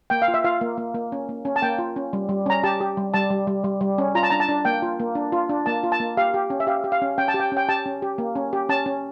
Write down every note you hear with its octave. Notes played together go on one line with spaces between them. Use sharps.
A#3 G5
F5
F4
E5
F4 F5
A#3
A#3
A#3
C#4
A#3
C#4
A5
A#3 G5
F4
C#4
G3
G3
C#4 A#5
G4 A5
G4
G3
G3 A5
G3
G3
G3
G3
C#4
F4 A#5
A5
D4 A#5
A5
D4
A#3 G5
F4
A#3
D4
F4
D4
A#3 A5
F4
A5
A#3
G4 F5
G4
C#4
E5
G4 F5
G4
F5
C#4
C#4 G5
A5
G4
G5
C#4 G5
G4 A5
C#4
G4
A#3
C#4
G4
C#4 A5
C#4